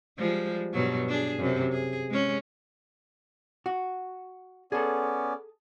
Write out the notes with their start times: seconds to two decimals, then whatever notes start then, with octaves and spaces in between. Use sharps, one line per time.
0.18 F3 G3 G#3
0.73 G2 B2 F#3
1.09 D4 G#4
1.39 F#2 C3
1.72 G#4
2.10 G#3 C#4
3.66 F#4
4.72 B3 C#4 G#4 A4 D5